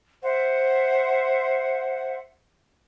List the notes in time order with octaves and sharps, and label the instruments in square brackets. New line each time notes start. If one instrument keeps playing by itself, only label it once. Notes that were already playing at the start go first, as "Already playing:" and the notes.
[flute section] C5 E5 F#5